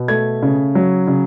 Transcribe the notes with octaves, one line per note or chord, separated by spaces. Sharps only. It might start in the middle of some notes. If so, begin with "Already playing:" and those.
Already playing: B2
A3 G#6
C#3
F#3
C#3